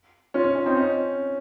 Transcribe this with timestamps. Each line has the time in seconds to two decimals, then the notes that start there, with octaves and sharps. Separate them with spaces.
0.34 C#4 F4
0.44 C#4
0.55 C#4
0.66 C4 D#4
0.77 C#4